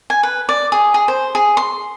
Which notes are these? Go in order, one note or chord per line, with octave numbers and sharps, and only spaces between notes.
G#5
B4
D5
G#4
G#4
C5
G#4
C6